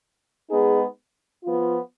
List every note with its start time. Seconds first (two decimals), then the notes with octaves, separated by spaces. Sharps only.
0.50 G#3 B3 D#4 G#4
1.44 F3 B3 F4